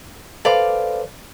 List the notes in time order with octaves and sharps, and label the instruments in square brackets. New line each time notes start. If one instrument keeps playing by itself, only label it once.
[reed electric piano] A4 B4 C5 [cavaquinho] D5 F5 D6